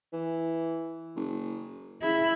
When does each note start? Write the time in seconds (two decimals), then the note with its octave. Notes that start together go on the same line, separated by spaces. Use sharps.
0.13 E3
1.16 F#1
2.02 C#3 E4